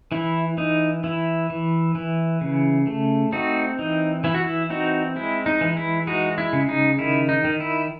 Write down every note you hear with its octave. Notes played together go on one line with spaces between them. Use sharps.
E3 E4
E3 D#4
E3 E4
E3
E3
C#3
A3
C4 D#4 F#4
E3 D#4
E3 E4
F#4
E4
C4 D#4 F#4
G#3 E4
D#4
E3
E4
G#3 D#4 F#4
E4
C#3
D#4
D#3 E4
D#4
D#3
E4